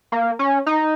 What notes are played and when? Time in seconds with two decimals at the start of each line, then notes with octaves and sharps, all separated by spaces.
0.12 A#3
0.39 C#4
0.66 D#4